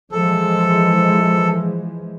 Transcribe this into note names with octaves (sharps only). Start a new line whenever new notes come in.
E3 F3 G#3 A4